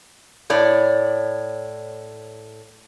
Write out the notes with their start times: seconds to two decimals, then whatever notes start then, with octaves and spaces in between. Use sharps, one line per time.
0.50 A2 C#5 D5